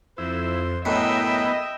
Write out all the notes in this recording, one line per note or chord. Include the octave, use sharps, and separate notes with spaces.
F2 E4 C5
F#2 A2 B3 E4 D#5 E5 G5 B5